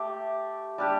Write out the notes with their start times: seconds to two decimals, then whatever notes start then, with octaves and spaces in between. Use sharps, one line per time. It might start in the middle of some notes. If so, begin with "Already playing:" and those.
Already playing: A3 G4
0.78 G3 D4 G4